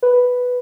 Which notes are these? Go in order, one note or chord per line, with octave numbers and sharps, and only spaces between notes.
B4